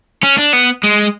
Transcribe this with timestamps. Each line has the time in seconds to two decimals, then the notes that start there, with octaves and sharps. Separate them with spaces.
0.23 C#4
0.38 D4
0.53 B3
0.83 G#3